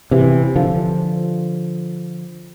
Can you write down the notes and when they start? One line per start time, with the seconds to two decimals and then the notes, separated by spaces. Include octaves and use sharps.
0.11 C3 E3
0.56 D3 F3